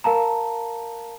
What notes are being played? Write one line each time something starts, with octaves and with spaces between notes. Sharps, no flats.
A#4 F5 A5 A#5